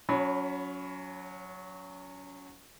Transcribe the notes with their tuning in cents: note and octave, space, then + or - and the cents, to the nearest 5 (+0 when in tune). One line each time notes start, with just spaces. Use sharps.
F#3 -15 C#4 +25 B5 +0